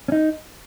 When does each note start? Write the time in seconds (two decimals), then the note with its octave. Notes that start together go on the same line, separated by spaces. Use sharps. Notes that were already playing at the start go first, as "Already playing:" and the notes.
0.08 C#4
0.12 D#4